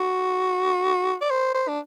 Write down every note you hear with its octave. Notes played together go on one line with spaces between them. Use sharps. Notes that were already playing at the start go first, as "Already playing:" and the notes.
Already playing: F#4
D5
C5
C5
D4